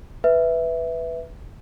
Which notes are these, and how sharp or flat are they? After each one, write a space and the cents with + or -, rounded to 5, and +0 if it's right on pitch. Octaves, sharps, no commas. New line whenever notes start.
B4 +0 E5 +0